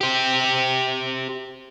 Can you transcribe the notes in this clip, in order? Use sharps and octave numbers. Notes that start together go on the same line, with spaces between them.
G4 C5